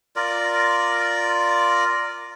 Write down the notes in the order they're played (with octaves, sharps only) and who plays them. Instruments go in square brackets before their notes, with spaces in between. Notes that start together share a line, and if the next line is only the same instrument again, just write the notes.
[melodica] F4 A#4 D5